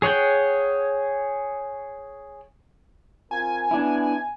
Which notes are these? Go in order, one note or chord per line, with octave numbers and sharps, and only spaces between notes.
G#4 C#5 F#5 G5
C4 F4 A#4 G#5
B3 D4 E4